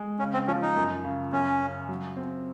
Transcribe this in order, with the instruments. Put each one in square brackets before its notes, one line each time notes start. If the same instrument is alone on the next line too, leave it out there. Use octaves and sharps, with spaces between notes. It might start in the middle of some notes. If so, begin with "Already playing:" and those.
Already playing: [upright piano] G#3
[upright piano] C#3 [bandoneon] C#4
[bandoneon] C4
[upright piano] F3 [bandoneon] C#4
[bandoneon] D#4
[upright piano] F#2
C#3
[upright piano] F#2 [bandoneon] C#4
[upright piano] C#3
F#3
C4